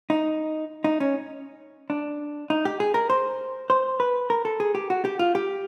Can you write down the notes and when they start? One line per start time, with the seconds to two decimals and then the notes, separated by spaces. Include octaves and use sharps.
0.10 D#4
0.84 D#4
1.00 C#4
1.90 D4
2.50 D#4
2.65 G4
2.80 G#4
2.94 A#4
3.10 C5
3.70 C5
4.00 B4
4.30 A#4
4.45 A4
4.60 G#4
4.75 G4
4.90 F#4
5.05 G4
5.19 F4
5.35 G4